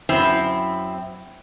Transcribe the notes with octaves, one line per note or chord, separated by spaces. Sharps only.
F#2 C4 E4